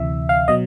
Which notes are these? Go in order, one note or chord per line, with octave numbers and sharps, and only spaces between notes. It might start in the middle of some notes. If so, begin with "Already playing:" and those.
Already playing: D2 C3 E3 E5
F5
B2 F#3 D#5